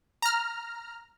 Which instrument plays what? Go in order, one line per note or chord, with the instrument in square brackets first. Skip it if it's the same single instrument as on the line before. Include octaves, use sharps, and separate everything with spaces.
[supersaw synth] A#5 F6